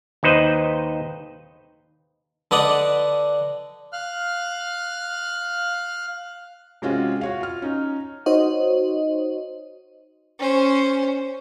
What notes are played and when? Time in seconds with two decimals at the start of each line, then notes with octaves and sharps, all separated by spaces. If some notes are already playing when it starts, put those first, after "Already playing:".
0.23 D#2 D#4 B4 C5 D#5
2.51 D3 B4 D5 D#5 F#5
3.93 F5 F6 F#6
6.82 C3 G#3 C#4 F4 F#4
7.21 F#4 C#5 F5
7.40 F4 F6
7.62 C#4 D#4
8.26 D#4 F#4 C5 C#5 D#5
10.40 C#4 C5